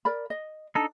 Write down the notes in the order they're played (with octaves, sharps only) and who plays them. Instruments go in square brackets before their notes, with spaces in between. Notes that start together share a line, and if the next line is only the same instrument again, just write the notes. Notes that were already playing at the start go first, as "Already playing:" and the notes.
[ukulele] A#4 D5 B5
D#5
[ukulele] D4 [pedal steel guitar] D#4 A4